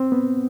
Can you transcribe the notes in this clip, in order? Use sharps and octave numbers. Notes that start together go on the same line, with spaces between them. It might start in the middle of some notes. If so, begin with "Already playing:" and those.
Already playing: C4
B3